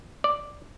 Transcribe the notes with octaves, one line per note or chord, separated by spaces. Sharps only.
D5